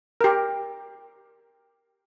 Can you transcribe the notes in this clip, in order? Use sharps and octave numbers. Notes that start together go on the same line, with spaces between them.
G4 A#4